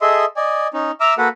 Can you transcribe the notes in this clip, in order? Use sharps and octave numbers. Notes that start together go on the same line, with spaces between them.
G#4 A4 D#5 E5 C6
D5 D#5 G#5
C#4 D#4
E5 A#5 D6 E6 F6
A#3 F#4 A4 B4 F#5